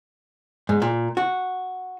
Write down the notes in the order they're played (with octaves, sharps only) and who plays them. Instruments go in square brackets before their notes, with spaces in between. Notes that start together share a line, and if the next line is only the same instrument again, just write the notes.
[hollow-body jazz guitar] G#2
A#2
F#4